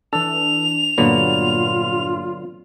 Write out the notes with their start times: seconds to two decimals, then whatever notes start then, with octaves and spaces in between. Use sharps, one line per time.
0.13 E3 D4 A4 F7
0.98 G2 A#2 D3 F#3 A#3 B3 F4